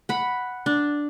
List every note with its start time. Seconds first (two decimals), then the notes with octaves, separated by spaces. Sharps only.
0.09 F#5 B5
0.66 D4